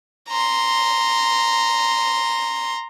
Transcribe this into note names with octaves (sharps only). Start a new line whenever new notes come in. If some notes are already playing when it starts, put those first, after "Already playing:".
A#5 C6